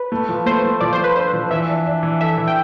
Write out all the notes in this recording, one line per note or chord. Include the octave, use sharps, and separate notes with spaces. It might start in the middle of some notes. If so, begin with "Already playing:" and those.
Already playing: B4
A3
F3
A3 C5
A3
F3 D5
C5
F3
B4
D4 C5
F3
E3 E5
D4
D4
E3
A4 E5
E3
G5